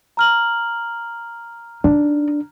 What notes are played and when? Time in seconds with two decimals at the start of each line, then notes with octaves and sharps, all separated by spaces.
0.17 A#5 F6 F#7
1.84 D4 D#4